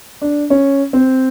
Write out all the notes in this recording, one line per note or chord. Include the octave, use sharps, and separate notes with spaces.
D4
C#4
C4